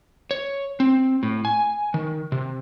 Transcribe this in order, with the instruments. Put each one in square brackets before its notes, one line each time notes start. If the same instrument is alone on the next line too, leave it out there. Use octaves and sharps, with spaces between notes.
[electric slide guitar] C#5
C4
A2
G#5
D#3
C3